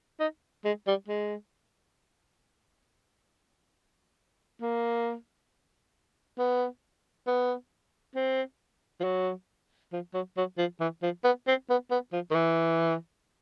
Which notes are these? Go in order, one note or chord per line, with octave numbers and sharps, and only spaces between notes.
D#4
G#3
G3
G#3
A#3
B3
B3
C4
F3
F#3
F3
F#3
F#3
F3
E3
F3
B3
C4
B3
B3
F3
D#3
E3